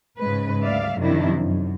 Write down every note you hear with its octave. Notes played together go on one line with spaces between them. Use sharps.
G#2 C#3 G#3 B4
D2 G3 D5 E5 F5
F#2 C3 D#3 F3 D4 E4
F#2